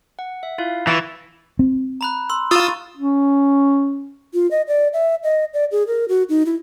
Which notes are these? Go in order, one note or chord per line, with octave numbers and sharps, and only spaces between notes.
F#5
E5
E4 F4 F5
E3 C#6 A6 A#6
C4
A#5 B5 F#6
C6 E6
F4 C#6 D#6 E6 A6 D#7
C#4
F4
D#5
D5
E5
D#5
D5
G#4
A#4
F#4
D#4
E4